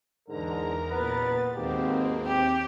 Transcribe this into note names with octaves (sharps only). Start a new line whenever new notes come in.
E2 G#2 D3 A#4 A#5
F#1 A#2 B3 B4 A6
D#2 G#2 B2 A#3 C4 G4
G4 G5